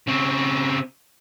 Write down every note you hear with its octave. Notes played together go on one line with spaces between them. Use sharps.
C#3 C4